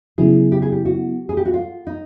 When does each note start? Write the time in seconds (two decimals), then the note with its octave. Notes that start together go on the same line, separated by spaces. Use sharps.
0.18 C#3 F#3 B3 E4 G#4
0.52 G4
0.62 G#4
0.72 G4
0.85 F#4
1.29 G#4
1.37 G4
1.45 F#4
1.54 F4
1.87 D#4